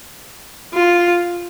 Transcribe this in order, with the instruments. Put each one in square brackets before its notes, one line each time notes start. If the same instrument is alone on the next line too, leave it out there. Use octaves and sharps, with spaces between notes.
[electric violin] F4